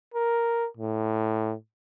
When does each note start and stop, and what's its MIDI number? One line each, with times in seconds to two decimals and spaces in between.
0.14 0.67 70
0.77 1.54 45